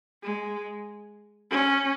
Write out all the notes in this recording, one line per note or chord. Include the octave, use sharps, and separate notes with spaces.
G#3
C#4